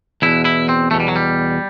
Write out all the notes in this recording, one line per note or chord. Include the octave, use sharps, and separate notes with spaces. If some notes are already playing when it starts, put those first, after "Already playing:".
E2 B2 E4
E4
C4
E2 B2 A3
G3
F#3
G3